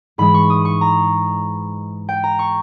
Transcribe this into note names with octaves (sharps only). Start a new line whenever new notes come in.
G#2 E3 G#3 B5
C#6
D#6
C#6
A#5
G5
A#5
C#6